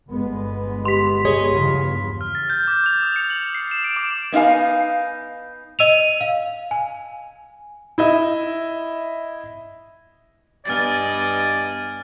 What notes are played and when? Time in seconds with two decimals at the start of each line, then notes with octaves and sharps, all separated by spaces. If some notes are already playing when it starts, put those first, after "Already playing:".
0.10 G1 G#3 B3
0.85 G4 C6 B6
1.25 G#4 C#5 D#5
1.55 E2 G2 C#3 F3
2.21 F6
2.35 A6
2.50 G6
2.68 D6
2.86 F7
3.03 D#6
3.16 C#7
3.30 F#7
3.55 C7
3.71 E7
3.84 D7
3.96 D6
4.32 B3 D#4 F4 F5 G#5
5.79 D#5 E6 D#7 F7
6.21 F5
6.71 G#5
7.98 E4 D#5 E5
10.65 G2 B3 D5 D#5 G#5 F6 A6